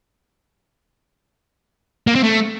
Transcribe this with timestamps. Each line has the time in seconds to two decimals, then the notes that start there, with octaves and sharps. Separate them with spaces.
2.07 A#3
2.15 C4
2.23 A3